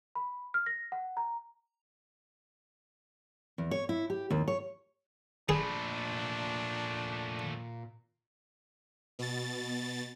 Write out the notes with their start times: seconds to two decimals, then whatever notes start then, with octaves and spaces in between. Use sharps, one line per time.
0.15 B5
0.54 F6
0.66 A#6
0.92 F#5
1.17 A#5
3.58 E2
3.71 C#5
3.89 E4
4.10 G4
4.30 D#2
4.48 C#5
5.49 A#2 F3 A3 D4 G#4 B5
9.19 B2 A6